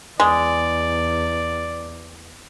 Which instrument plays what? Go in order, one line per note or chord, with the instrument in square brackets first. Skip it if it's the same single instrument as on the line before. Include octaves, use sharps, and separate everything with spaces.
[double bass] E2 [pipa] G#3 [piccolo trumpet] D5